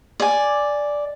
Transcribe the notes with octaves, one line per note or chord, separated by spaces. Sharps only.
D5 G#5